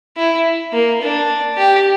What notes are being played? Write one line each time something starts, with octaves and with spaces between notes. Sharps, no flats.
E4
A#3
D4
G4